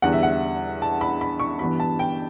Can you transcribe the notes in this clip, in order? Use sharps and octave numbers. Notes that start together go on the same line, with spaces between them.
E2 D3 G3 F#5
E5
F#5
A5
B5
B5
C#6
G2 E3 B3 B5
A5
G5